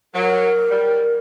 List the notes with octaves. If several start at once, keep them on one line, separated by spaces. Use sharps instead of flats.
F#3 A#4
G3